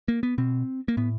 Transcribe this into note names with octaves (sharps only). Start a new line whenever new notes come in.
A#3
B3
B2 C4
A#3
A2 B3